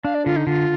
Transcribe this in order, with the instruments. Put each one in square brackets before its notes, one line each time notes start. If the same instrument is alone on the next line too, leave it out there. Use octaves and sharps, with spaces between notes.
[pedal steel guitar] D4 [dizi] F5
[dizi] D5
[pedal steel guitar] D3 [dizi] F4
[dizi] D#4
[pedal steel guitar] D3 [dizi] F4